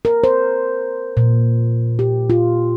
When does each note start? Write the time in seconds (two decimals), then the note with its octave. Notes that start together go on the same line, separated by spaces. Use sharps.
0.05 A#4
0.24 C5
1.17 A#2
1.99 G4
2.30 F4